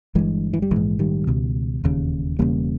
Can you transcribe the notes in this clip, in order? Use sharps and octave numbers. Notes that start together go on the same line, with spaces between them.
G1 G2 E3 G#3
E3
G3
A#1 G#2 E3 G#3
D#3 G3
C#2 B2
E1 D#2 C#3
E1 E2 C#3 G3 A#3